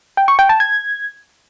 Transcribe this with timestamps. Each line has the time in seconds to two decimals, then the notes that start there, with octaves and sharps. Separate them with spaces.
0.17 G5
0.28 C#6
0.39 G5
0.49 A5
0.60 G#6